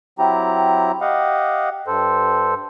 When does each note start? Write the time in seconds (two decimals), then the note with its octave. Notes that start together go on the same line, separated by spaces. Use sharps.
0.19 F#3 C4 E4 G4 A#5
1.01 G4 D#5 F5 F#5
1.87 G2 A4 C5